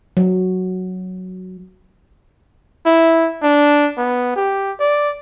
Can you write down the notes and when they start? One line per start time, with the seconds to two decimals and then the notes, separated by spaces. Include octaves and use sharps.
0.17 F#3
2.86 E4
3.42 D4
3.97 B3
4.36 G4
4.79 D5